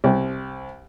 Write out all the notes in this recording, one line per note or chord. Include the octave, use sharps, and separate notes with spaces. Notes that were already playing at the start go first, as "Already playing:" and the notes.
C2